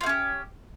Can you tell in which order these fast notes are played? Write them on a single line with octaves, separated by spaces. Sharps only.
F4 A3 C#4 G4